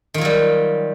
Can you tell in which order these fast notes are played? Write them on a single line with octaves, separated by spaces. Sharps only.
D#3 F4 F#3 G3